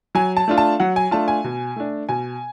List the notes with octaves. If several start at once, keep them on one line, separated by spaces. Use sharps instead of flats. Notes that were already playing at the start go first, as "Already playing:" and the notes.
F#3 G#5
A5
A3 D4 F4
A5
F#3 F#5
G#5
A3 D4 F4 A5
G#5
B2
A3 D4
B2 G#5